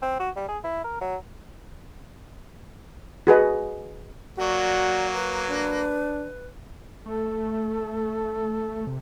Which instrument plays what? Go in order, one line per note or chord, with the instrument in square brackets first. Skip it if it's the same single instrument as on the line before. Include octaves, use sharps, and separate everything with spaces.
[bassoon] C4
F#4
G3
G#4
E4
A#4
F#3
[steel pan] F#4 G#4 B4 D#5
[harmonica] F#3 A#3 [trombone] F#4 [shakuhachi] D5
[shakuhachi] B4
[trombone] D4
[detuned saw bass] A3 [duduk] A4
[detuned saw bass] C3